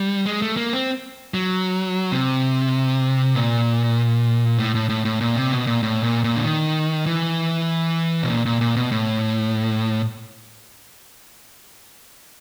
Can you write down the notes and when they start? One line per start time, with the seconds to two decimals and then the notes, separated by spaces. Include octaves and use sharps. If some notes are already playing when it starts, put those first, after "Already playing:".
Already playing: G3
0.26 G#3
0.42 A3
0.57 A#3
0.73 C4
1.34 F#3
2.12 C3
3.35 A#2
4.59 A2
4.75 A2
4.89 A2
5.05 A2
5.21 A#2
5.36 C3
5.52 B2
5.67 A#2
5.83 A2
6.03 A#2
6.24 A#2
6.35 D3
6.45 D#3
7.06 E3
8.23 B2
8.29 A#2
8.45 A#2
8.61 A#2
8.76 B2
8.92 A2